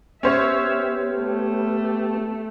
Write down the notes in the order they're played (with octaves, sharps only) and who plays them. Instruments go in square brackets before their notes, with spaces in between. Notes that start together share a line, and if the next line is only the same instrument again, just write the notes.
[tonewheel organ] B3 G4 [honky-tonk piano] C#4 C5 C#5 [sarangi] E5
[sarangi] A3